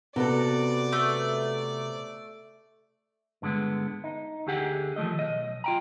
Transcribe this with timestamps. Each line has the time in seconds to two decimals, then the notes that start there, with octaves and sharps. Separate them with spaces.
0.16 C3 B3 F#4 A4 D5
0.92 A3
3.42 G2 D3 G#3 B3
4.04 D#4
4.47 D2 D3 G4 G#4 F#5
4.96 D#3 F3 A3 D#5
5.19 B1 D#5
5.64 F4 G5 A#5